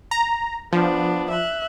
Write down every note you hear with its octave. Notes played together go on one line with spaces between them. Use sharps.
A#5
F3 B3 D4
E5 F#6